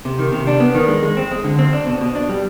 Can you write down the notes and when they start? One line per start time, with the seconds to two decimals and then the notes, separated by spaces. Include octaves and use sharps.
0.05 C3
0.19 D#3
0.32 C3
0.47 D4
0.60 B3
0.75 D#3
0.88 G#3
1.03 G#3
1.17 C4
1.31 G#3
1.44 D3
1.59 C4
1.73 D4
1.86 B2
2.01 B2
2.15 D4
2.29 G3